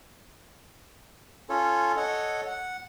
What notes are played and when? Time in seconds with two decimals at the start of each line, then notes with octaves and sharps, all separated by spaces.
1.49 C#4 F4 A4 C#5
1.97 A4 C#5 D#5 F#5
2.47 F#5